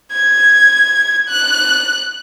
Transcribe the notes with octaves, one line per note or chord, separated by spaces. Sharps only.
G#6
F#6